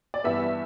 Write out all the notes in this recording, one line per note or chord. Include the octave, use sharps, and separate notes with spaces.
D5
G2 E3 G3 B3 E5